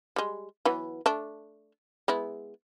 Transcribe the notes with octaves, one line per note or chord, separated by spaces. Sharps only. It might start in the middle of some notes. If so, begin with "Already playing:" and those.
G3 G#3
E3 F#3 B3
A3 D4
G#3 B3 E4